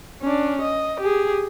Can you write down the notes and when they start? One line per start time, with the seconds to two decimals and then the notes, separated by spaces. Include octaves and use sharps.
0.22 C#4 D4
0.61 D#5
1.00 G4 G#4